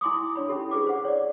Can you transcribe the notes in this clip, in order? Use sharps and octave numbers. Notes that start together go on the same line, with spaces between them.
E4 G#5 C6 D6 D#6
D4 C#5 B5
C#4 E4 G4 A4
D4 G4 G#4 B4 D6
C5 F#5
C#5 D5